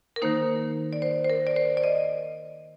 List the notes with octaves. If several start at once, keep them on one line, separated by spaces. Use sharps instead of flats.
A#4
D#3 A#3 D#4 C5
D5
C5
C5
A#4
D5
C5
D5
D#5